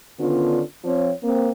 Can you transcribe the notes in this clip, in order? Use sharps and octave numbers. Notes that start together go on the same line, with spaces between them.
D3 D#3 B3 C#4 D4 F4
F3 C4 C#5
A#3 C4